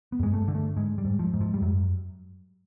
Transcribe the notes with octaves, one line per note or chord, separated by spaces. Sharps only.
B3
G2 G#3
A3
D3
A3
G#2 G#3
G3
G#2
F3
G#2
F3
G3
F#2 F#3